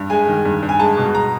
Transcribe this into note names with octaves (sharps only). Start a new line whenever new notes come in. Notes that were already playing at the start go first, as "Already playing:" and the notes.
Already playing: G2
G#3 G#5
D#3
G2
G2
G#5
G#3 A5
B2
A#5